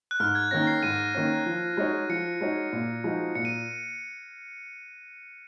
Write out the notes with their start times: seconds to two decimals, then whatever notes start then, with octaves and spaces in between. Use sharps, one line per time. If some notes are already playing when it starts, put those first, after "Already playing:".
0.11 F#6
0.20 G#2 F6
0.35 G#6
0.51 D#3 A#3 C#4 A#6
0.67 C7
0.83 G#2 D#7
1.15 D#3 A#3 C#4
1.46 F3
1.77 G#3 D#4 F#4 C#5
2.09 F3 C#7
2.41 G#3 D#4 F#4 C#5
2.73 A#2
3.04 F3 G#3 D#4 F#4
3.35 A#2 C#7
3.45 D#7